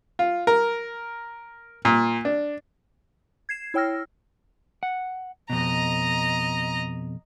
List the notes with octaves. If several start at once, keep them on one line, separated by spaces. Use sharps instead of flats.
F4
A#4
A#2
D4
G#6 C7 E7
E4 C#5 G5 E6 F6 A#6
F#5
F2 B2 D#5 A#5